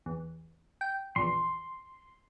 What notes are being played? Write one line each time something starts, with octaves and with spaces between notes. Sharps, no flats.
E2
G5
A#1 E2 C6